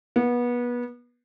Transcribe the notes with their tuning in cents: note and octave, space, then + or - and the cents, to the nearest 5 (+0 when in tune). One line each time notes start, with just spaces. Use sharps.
B3 -25